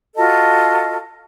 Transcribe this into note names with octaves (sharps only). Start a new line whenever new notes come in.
F4 F#4 A4 D#5